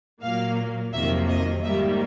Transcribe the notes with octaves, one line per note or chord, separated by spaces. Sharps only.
A#2 F#3 A#3 F5
F2 C3 D#3 F#3 A#3 E5
D#5
G#2 D#3 G3 A#3 E5